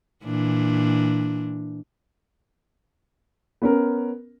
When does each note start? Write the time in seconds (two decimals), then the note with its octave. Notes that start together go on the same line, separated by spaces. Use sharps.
0.25 A#2 E3 D4
3.62 B3 C#4 A#4